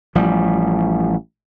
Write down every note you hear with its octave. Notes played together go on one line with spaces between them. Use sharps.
A1 F3 G3